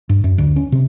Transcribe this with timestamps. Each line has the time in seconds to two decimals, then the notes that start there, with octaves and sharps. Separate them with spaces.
0.09 G2
0.24 F#2
0.38 D2
0.56 C#4
0.72 C3